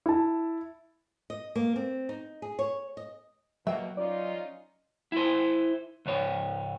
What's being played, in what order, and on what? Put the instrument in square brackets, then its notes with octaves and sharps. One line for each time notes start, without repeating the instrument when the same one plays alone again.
[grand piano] E4 A5
[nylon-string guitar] D#5
A#3
C4
D#4
G#4
C#5
D#5
[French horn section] B2 A#3 [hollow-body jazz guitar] F#3 G5 [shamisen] E5
[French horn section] C#4 D#4 F4 [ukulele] D5
[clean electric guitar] E4 C5
C#2 G#2 C#5